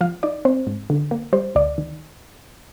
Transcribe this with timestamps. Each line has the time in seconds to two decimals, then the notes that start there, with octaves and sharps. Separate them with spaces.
0.01 F3 F5
0.23 D#4 D5
0.45 C4 C5
0.67 G#2
0.90 D3
1.11 A#3
1.33 G3 C5
1.55 D2 D5
1.78 D#3